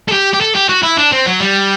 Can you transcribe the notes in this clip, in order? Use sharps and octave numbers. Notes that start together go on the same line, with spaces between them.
A4
G4
G4
A4
G4
F#4
E4
D4
C4
F#3
G3